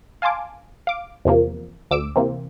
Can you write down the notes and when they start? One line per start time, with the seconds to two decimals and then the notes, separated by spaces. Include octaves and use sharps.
0.22 F5 G#5 A5 C6 D6
0.87 F5 D6
1.25 E2 C3 F3 A#3
1.91 D2 D6 E6 D7
2.16 C3 E3 A#3 C4